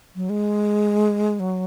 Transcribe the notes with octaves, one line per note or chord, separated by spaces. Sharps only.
F#3
G#3
F#3